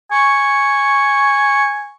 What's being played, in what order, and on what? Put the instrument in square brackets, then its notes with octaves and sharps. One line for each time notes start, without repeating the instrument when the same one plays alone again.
[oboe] G#5 [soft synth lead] C#6